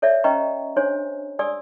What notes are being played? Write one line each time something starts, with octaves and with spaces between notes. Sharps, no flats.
A4 C#5 D5 E5
C#4 B4 D#5 G5 A#5 C#6
D4 G4 C5 C#5 G#5
G4 D5 G#5 D#6 E6